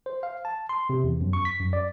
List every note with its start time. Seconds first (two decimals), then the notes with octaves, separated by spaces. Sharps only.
0.06 C5
0.23 F5
0.45 A5
0.69 C6
0.90 C3
1.04 E2
1.21 F#2
1.33 C#6
1.45 B6
1.60 F#2
1.73 D5